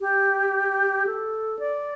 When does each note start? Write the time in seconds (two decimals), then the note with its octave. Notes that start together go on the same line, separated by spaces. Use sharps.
0.01 G4
1.07 A4
1.59 D5